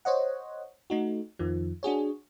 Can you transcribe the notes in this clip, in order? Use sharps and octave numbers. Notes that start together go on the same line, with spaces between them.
C5 C#5 D#5 F#5
A3 D#4 F#4
F2 D#3 F3
D4 F#4 G#4 C#5